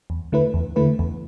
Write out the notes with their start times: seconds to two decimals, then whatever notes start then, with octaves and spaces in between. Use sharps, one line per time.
0.10 E2
0.32 D3 A3 E4 B4
0.54 E2
0.76 D3 A3 E4 B4
0.99 E2